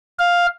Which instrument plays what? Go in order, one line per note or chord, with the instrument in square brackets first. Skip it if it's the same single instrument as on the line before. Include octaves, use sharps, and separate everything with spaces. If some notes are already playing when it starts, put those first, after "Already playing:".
[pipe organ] F5